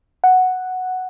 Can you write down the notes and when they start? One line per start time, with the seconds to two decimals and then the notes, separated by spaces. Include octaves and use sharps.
0.24 F#5